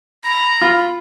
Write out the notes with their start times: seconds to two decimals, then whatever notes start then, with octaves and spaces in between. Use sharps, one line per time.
0.24 A#5 B5
0.61 F4